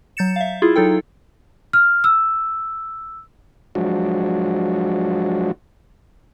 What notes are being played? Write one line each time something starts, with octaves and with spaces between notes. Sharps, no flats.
F#3 G6 A6 C#7 E7
E5 F5
E4 F4 G#4
F#3 D#4 A4 G5
F6
E6
F3 F#3 G#3 D4 F#4